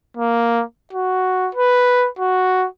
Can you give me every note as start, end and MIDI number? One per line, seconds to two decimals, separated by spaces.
0.17 0.63 58
0.93 1.50 66
1.55 2.08 71
2.19 2.67 66